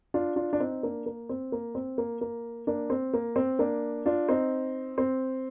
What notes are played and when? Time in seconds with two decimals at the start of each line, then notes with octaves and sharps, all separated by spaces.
0.14 D4 F4
0.36 D4 F4
0.53 D4
0.59 C4 D#4
0.83 A#3 D4
1.06 A#3
1.29 C4
1.52 A#3
1.75 C4
1.98 A#3
2.21 A#3
2.67 A#3 D4
2.90 C4
3.13 A#3
3.36 C4
3.59 A#3 D4
4.06 D4 F4
4.29 C4 D#4
4.98 C4